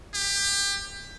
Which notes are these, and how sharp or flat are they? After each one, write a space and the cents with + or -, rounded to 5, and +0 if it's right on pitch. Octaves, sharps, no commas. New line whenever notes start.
G4 +25